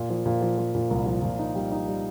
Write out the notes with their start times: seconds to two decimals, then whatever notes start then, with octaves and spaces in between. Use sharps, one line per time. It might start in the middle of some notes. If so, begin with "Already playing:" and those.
Already playing: A#2
0.10 F3
0.26 A#2
0.42 F3
0.58 F3
0.75 A#2
0.91 C2
1.06 F3
1.22 A#2
1.39 D#4
1.55 G3
1.72 D#4
1.88 G3